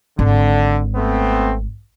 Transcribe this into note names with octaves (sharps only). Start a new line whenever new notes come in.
G#1 D3
A3 B3 C4